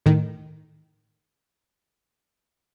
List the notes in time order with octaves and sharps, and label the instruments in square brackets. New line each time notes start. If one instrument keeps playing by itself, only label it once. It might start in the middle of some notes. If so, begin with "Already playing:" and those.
[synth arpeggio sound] A2 D#3